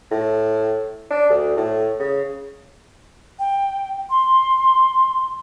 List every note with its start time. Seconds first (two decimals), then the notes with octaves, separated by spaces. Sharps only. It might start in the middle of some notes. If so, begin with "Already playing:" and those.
0.11 A2
1.11 D4
1.30 D2
1.57 A2
1.99 C#3
3.39 G5
4.10 C6